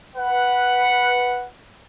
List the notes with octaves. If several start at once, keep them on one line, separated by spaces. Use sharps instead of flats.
B4 F#5